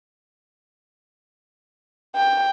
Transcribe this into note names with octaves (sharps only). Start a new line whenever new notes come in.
G5